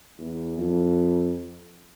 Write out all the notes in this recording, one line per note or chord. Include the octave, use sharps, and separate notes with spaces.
E2
F2